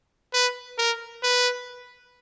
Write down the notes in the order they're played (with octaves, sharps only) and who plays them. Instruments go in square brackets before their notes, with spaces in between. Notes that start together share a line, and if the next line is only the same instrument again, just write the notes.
[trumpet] B4
A#4
B4